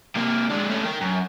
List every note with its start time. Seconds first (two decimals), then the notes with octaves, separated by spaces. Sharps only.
0.16 C3 A#3
0.50 G#3 D4
0.70 A3 C#4
0.85 A#4 G5
1.01 F#2